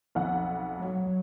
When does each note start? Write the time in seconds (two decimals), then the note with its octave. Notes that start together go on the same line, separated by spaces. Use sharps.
0.15 B1 F2 F#5
0.80 F#3